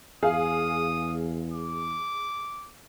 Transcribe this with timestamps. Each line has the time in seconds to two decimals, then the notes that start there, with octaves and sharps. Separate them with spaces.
0.23 E2 G#4 F5 D#6
1.53 D6